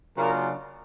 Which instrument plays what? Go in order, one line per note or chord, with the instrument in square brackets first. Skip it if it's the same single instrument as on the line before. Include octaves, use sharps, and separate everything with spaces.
[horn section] C#3 F#3 A#3 D4 F4 A#4